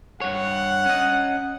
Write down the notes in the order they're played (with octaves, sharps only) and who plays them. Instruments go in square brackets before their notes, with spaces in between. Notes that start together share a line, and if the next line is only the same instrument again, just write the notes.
[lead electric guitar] G2 C#5 [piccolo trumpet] F#5
[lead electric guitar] C#4 D#5